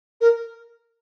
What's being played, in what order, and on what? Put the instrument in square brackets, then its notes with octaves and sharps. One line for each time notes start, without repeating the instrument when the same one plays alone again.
[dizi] A#4